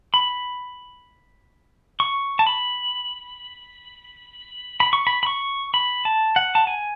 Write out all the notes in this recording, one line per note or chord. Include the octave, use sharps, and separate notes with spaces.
B5
C#6
A5
B5
B5
C#6
B5
B5
C#6
B5
A5
F#5
A5
G#5